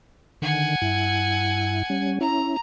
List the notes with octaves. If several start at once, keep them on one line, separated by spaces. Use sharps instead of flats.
D3 D#3 F#5 G#5
G2 E4
G3 C#4
C#4 E4 A#5